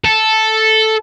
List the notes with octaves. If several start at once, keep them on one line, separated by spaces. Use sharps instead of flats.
A4